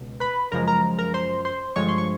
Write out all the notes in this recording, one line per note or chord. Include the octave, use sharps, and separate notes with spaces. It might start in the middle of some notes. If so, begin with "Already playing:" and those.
Already playing: C#2 B2
B4 B5
F#2 C#3 F3 G#3 A#4 A#5
A#4 A#5
A#4 A#5
C5 C6
C5 C6
G2 D3 F3 G#3 C#5 C#6
C6
C#6